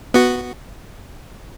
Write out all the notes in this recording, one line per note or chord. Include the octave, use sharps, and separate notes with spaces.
B3 F#4